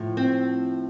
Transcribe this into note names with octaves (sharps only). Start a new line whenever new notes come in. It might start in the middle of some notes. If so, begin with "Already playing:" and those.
Already playing: A2 F3
C4